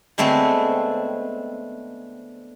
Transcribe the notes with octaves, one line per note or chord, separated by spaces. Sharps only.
D3 G#3 A3 B3 C4